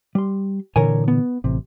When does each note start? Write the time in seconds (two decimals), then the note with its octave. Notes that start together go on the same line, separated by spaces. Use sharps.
0.15 G3 C6
0.76 A#2 D3 E3 A#4 C#5 G#5
1.08 B3
1.44 A1 C3